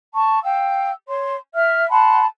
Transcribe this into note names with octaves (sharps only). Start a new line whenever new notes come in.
A5 C#6
F5 G5 E6
C#5 C6
E5 F6
F#5 A5 B5 C6